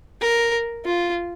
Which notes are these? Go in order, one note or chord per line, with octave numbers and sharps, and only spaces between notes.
A#4
F4